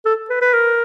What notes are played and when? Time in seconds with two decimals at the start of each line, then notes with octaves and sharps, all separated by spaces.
0.05 A4
0.30 B4
0.42 B4
0.53 A#4